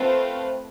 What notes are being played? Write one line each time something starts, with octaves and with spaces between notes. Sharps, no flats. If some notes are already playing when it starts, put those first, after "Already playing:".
Already playing: A3 C4 F4 B4